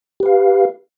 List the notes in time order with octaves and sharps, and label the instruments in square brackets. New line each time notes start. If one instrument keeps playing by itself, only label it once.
[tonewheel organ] G4
B4
F5